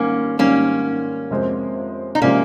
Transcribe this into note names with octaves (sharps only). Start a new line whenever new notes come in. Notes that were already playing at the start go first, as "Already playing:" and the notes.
Already playing: G#2 D#3 G3 A#3 C#4
G#2 D#3 G3 A#3 C#4
F2 C3 F3 G#3 C4
D#4
C3 F3 G#3 A#3 C4 C#4